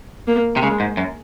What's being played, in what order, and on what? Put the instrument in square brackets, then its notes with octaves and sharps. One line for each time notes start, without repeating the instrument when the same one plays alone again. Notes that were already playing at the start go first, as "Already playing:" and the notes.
[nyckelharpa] A#3
[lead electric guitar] C3
[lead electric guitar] C#3 [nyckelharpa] G#3
[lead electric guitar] G#2
F#2